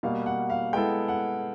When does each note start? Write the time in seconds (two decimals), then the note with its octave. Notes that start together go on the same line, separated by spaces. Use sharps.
0.03 B2 G3 A#3 F5
0.26 F#5
0.49 F5
0.73 G#3 B3 E4 A4 G5
1.08 F#5